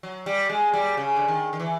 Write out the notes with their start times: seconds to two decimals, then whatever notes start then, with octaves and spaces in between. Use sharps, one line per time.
0.03 F#3
0.26 G3
0.49 G#3
0.73 G3
0.97 C#3
1.16 D3
1.28 D#3
1.53 D#3
1.60 E3